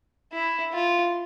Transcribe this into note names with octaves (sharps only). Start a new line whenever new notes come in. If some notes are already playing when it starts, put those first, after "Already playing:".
E4
F4